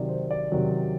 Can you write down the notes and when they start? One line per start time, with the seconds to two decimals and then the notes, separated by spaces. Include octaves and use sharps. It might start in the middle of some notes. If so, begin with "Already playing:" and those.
Already playing: C3 D#3 F#3 D5
0.09 C5
0.31 D5
0.52 C3 D#3 F#3